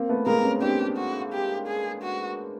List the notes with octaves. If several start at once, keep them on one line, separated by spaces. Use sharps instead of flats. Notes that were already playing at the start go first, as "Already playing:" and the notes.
Already playing: A#3 C4
A3 B3
G#3 A#3 A#4
C4
B3 C#4
C4 D4 G4
F#4
G4
G#4
F#4